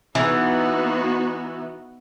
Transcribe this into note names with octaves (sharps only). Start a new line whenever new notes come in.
E3 B3 D#4 F#4